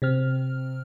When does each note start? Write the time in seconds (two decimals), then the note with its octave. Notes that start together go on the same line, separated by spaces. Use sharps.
0.02 C3 C4 F6